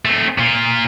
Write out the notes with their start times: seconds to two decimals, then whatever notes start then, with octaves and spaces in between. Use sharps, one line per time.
0.05 A3 C4
0.38 A#2 F4